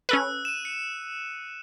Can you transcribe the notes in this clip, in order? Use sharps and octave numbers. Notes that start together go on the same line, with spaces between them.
C#4 A4 B4 E6 F#6
D#7 E7
C#7